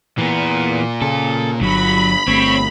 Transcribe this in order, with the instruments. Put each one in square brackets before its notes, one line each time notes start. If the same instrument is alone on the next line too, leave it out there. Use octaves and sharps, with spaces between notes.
[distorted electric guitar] A#2 [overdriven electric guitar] E3 B3
[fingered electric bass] C#3 [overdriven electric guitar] A4
[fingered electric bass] G1 [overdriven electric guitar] F#3 [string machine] B5
[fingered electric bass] G1 A3 [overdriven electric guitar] C4 [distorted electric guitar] C#5